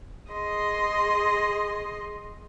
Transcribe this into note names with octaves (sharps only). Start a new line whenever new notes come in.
G#4 D#5 C6